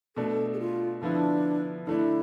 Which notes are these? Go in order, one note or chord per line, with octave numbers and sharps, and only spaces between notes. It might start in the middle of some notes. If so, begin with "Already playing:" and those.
B2 A3 D4 A4
G#4
F4
D3 F3 B3 D4 E4
D3 A3 D4 E4